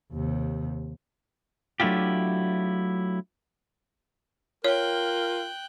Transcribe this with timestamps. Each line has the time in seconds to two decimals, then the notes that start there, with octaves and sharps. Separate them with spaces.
0.12 D#2 C3
1.80 F#3 A3 D4 E4 F4 G4
4.64 F4 A#4 C#5 G5 F#6